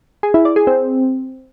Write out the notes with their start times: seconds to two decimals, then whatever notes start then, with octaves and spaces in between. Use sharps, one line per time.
0.23 G#4
0.34 E4
0.45 D5
0.56 G#4
0.67 C4